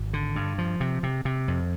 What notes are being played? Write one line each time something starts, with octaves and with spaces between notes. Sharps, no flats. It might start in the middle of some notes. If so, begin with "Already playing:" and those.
Already playing: G#1
D3
G2
F3
C3
C3
C3
F2